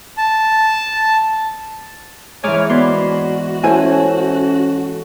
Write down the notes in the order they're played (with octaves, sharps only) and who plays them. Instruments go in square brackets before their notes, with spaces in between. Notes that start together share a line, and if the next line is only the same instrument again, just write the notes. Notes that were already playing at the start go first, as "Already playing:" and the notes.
[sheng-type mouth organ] A5
[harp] G#2 E3 [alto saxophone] C#5 [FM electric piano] G#5 D6 F6
[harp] B3 B4 D5 [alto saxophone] F#4 [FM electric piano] C6
[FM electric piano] C#4 A4 [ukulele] E4 C5 G#5